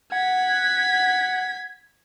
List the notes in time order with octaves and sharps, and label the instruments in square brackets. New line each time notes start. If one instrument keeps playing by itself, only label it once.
[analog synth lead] F#5 [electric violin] G#6 B6